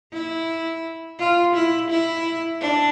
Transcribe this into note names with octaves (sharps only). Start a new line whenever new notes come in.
E4
F4
E4
E4
D4